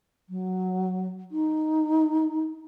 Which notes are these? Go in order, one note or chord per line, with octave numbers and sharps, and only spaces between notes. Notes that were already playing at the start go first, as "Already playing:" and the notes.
F#3
D#4